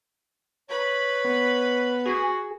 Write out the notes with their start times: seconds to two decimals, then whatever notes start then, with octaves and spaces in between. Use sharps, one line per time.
0.69 B4 C#5 B5
1.25 B3
2.05 F#4 G#4